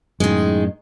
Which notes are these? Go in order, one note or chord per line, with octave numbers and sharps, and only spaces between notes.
F#2 A2 D#3 G#3